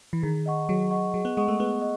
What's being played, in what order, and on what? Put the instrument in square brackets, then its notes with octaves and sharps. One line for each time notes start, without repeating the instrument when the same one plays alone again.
[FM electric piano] E3
[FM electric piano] D#3 [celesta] G#4
[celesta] D#5 F#5 C#6
[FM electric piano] F#3 [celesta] G#4
[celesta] D#5 F#5 C#6
[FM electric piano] F#3 [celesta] G#4
[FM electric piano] B3
[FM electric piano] G#3 [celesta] D#5 F#5 C#6
[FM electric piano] A3
[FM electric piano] B3 [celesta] G#4
[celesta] D#5